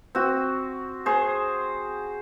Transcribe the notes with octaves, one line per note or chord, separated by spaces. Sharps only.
C4 F#4
G#4 C5